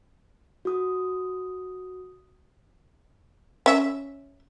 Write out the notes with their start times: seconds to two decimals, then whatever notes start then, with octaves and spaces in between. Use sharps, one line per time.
0.65 F#4 D#6
3.66 C#4 E5